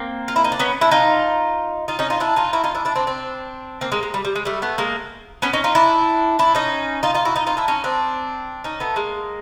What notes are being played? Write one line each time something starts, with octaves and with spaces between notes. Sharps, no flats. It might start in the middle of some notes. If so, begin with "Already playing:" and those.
Already playing: A#3 C4
F4
E4
D#4
D4
B3 C#4
D4 E4
D#4 F4
D#4 F4
C#4 D#4
D#4 F4
D4 E4
D#4 F4
E4 F#4
D#4 F4
D4 E4
D4 E4
C4 D4
C4 D4
A#3 C4
G#3 A#3
G#3
G3
G3
G#3
G3 A3
A3 B3
G#3 A#3
B3 C#4
C#4 D#4
D#4 F4
D4 E4
D4 E4
C#4 D#4
D#4 F4
D#4 F4
E4 F#4
D#4 F4
D#4 F4
D4 E4
C#4 D#4
C4 D4
C#4 D#4
A3 B3
G#3 A#3